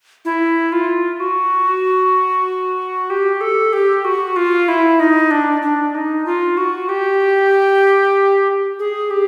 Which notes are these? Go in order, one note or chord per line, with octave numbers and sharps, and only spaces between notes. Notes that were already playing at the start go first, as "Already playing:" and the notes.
E4
F4
F#4
G4
A4
G4
F#4
F4
E4
D#4
D4
D4
D#4
F4
F#4
G4
G#4
G4